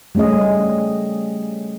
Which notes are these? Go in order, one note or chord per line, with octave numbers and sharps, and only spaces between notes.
G3 A3 C#4 G#4 D#5